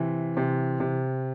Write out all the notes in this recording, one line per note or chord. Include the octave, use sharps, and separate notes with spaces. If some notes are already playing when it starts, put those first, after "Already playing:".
Already playing: C3 E3
C3
C3